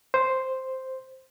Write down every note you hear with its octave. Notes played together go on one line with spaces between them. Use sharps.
C5